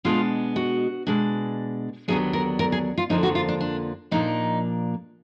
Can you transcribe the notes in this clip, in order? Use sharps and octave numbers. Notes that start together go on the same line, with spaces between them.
B2 G#3 B3 D4 F4
F#4
B2 G#3 D4
D#2 D3 F#3 B3 D4 G#4
A#4
A#4
G#4
F4
F2 D3 F3 A#3 D4 D#4
F#4
F4
D4
D4
A#2 F3 A#3 D4 D#4